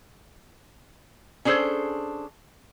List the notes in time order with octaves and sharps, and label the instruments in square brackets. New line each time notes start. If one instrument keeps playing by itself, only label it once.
[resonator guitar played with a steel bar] C#4 D4 G#4 A4 C5